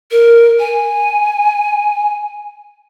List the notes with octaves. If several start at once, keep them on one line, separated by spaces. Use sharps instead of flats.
A#4
G#5